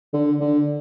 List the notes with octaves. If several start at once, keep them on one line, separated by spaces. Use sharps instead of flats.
D3
D3